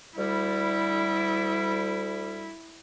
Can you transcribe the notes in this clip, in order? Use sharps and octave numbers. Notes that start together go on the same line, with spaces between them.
D2 G3 E4